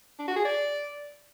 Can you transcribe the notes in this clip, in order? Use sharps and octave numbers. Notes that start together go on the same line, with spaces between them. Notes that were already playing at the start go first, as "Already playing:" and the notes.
D4
F#4
G#4
D5